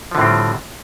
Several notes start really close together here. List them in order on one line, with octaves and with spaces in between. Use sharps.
F3 D3 A2 C4 G3